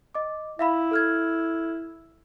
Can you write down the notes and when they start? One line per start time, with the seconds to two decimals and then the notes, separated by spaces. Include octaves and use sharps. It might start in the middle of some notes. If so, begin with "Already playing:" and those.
0.15 D#5 D6
0.59 E4 E5 F5 B5
0.91 A4 F6 G#6